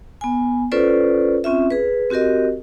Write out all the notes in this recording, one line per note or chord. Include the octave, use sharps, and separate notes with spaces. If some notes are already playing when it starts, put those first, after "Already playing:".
B3 G#5
C#4 F4 A4 B4 C5 D5
C4 C#4 F4 E5
G#4 B4
C4 F#4 G4 A#4 D#5